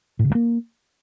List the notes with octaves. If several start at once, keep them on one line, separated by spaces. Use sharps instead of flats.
A2
C#3
G2
A#3